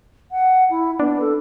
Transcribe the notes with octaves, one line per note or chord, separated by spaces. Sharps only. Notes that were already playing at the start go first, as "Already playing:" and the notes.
F#5
E4
B3 D4
A4